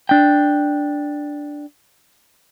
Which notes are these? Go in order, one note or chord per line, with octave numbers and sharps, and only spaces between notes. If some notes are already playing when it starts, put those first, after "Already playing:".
D4 G5